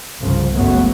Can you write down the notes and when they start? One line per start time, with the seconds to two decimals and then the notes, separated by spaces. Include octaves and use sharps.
0.20 G1 C2 C#3 F3
0.52 F#1 G2 F#3 A3 B3